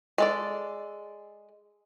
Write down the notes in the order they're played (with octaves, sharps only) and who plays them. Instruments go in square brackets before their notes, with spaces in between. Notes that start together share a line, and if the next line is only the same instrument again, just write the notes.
[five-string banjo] G#3 A4 D5